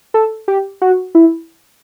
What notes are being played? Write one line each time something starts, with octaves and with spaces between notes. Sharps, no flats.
A4
G4
F#4
E4